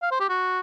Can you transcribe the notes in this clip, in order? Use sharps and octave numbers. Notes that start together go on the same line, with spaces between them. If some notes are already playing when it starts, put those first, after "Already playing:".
F5
C5
G4
F#4